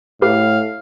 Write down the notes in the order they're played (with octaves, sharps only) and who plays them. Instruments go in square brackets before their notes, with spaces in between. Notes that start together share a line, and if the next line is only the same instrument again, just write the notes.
[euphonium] A2 [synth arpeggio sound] G4 B4 [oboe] F5